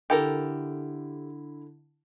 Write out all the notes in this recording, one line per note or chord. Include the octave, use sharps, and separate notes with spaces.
D3 E4 G4 A4 A#4